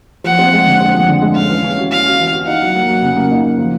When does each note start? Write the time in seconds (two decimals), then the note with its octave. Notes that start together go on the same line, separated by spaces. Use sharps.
0.24 F3 F#5
0.39 C4
0.53 G#3
0.66 D3
0.81 C4
0.95 F3
1.08 D3
1.22 G#3
1.35 C#4 F5
1.50 E3
1.64 C#4
1.78 F#4
1.91 C#4 F5
2.06 F#4
2.19 E3
2.33 F#4
2.47 D#4 F#5
2.61 F#3
2.75 A#3
2.88 F#3
3.02 C#3
3.16 A#3
3.31 D#4
3.45 A#3
3.58 F3